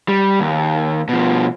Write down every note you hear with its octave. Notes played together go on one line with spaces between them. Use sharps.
G3
D#2
B2 F3